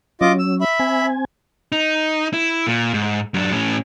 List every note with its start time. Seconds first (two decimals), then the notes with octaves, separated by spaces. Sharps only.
0.21 F#3 C#4 F4 D#5 D6
0.39 E6
0.61 E5 B5
0.80 C4 G#5
1.72 D#4
2.33 E4
2.67 A#2
2.94 G#2
3.34 F#2 D4
3.52 A2 C#4